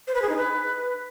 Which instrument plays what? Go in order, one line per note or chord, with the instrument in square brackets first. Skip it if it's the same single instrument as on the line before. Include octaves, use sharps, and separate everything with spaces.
[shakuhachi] C5
B4
G#4
D#4
B4